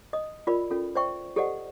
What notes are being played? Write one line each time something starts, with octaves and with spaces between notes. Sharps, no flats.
D#5 D#6
F4 A#4 D5 B5
C#4 F4 A4
C5 D5 E5 G5 C#6
G4 A4 C5 D5 D#5 F#5